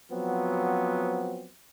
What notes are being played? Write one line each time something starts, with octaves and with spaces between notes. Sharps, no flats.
F3 F#3 B3 C4